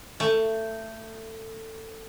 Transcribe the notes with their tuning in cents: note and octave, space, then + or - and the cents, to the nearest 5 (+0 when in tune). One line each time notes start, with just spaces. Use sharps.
A3 +20